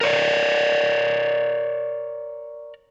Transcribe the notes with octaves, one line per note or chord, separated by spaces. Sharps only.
A#4 C#5 D5